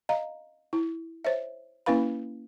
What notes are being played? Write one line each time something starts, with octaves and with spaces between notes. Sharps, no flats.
D#5 F5 A#5
E4
C5 C#5 E5
A#3 C#4 E4 B4 F5 B5